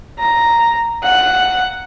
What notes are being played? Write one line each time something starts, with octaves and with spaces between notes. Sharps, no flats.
A#5
F#5